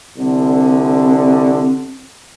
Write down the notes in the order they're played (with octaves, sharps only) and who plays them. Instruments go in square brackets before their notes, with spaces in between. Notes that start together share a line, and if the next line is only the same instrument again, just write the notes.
[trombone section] C2 D3 [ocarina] C4